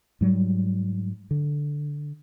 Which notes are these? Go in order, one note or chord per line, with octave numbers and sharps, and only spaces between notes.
G#2 F#3 G3
D3